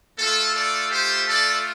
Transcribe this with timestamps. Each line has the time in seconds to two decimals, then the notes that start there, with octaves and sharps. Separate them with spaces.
0.18 A3 F4 A4
0.54 A4 D5
0.90 G4 C5
1.27 A4 D5